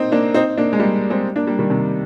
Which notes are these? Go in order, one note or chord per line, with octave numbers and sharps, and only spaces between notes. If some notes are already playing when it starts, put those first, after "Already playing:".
Already playing: A#3 C4 D#4
A#3 D4
C4 D#4
A#3 D4
G#3
G3 A#3
G#3 C4
A#3 D4
G3 A#3
D#3 G3
C3 D#3